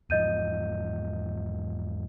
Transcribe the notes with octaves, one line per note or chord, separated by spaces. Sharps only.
E2 G#2 F3 D#5 G6 D#7